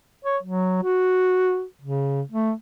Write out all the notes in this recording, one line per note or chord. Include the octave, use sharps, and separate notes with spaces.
C#5
F#3
F#4
C#3
A3